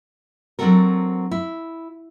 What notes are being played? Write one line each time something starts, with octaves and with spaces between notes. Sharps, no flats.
F#3 C4 D4 F#4 A4 A#4
E4